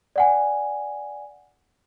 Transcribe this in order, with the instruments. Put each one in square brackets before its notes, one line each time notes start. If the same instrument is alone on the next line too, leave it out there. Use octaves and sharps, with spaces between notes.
[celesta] D5 F#5 G#5